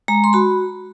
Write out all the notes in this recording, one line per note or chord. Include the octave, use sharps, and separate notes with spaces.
G#3 A#5
C6
F#4 B5